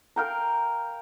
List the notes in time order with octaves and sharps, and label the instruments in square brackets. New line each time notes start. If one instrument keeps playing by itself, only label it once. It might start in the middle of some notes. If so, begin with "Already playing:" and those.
[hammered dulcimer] A#4 F5 G5 A#5